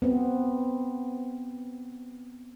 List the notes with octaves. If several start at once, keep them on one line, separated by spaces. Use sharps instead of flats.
B3 C4